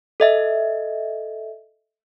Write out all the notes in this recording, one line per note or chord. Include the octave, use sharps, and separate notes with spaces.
A4 D#5 E5